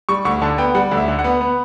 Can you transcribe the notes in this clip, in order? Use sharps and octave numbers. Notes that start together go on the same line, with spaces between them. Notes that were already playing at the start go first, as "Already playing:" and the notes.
G3 C#6
D2 C#6
D3 A5
B3 G5
G3 F#5
D2
E5
D3
F#5
B3
B3